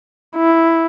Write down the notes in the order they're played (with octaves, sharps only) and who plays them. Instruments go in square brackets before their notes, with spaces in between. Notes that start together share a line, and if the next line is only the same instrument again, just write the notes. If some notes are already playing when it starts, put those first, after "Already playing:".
[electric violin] E4